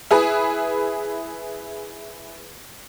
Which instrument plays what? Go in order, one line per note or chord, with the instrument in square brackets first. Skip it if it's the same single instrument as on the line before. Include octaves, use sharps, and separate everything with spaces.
[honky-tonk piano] E4 G#4 B4